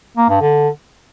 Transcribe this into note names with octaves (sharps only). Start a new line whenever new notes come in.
A#3
G2
D3